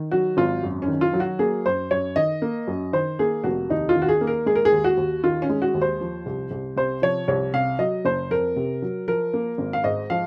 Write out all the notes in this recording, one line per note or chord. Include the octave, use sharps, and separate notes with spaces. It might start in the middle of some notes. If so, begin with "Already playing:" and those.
Already playing: D#3
F#3 F#4
G#1 F4
F#2
C#4
D#3
F4
F#3
F#4
A#3 G#4
F#2 C5
F#2 C#5
D#3 D#5
A#3
F#2
D#3 C5
A#3 G#4
F1 F#4
D#2 D#4
F4
D#3
F#4
G#4
A#3
A#4
G#3 G#4
A#4
G#4
D#2
F#4
D#2
D#3 F4
C#4
G#3
F#4
D#2
C5
F3
C2
C2
C3 C5
F3 C#5
C2 C#5
C3 F5
F#3 D#5
F#1 C5
F2 A#4
C3
F#3
F3 A#4
A#3
G#1
F5
G#2 D#5
F3 F5